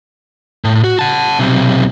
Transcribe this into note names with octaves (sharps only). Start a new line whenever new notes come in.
A2
F#4
F#5 A5
B1 C3